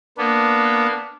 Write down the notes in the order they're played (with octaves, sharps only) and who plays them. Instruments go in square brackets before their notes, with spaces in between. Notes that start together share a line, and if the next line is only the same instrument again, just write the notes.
[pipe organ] A#3 B3 [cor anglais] D4